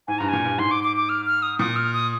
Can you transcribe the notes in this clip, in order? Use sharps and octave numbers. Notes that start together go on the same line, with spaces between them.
G#2 G#5
G2 A#5
A#2 G#5
G2
G#2 C6
D6
D6
D6
F6
F6
D#6
A#2 D#6
F6
D#6